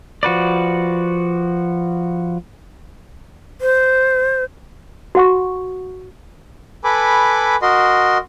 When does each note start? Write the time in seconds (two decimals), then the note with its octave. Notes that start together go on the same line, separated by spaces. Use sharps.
0.23 F3 F#4 B4 D5
3.61 C5
5.15 F#4 F#5 C#6
6.84 A4 B4 G#5 B5 D6
7.62 F#4 A#4 D#5 C6